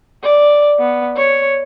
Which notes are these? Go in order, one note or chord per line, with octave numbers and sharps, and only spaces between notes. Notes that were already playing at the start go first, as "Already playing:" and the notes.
D5
B3
C#5